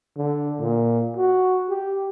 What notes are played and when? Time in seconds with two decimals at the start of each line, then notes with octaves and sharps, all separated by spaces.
0.17 D3
0.61 A#2
1.17 F#4
1.69 G4